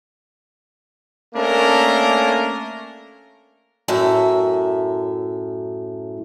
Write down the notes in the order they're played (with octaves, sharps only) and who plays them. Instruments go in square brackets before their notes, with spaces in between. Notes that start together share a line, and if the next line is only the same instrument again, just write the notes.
[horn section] A3 A#3 C#4 D4 A#4
[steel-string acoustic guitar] F#2 A2 E5